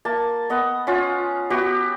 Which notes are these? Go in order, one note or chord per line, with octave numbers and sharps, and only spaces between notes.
A#3 A5
B3 D#5 F#5
C#4 F4 F#5
B3 F#4 G4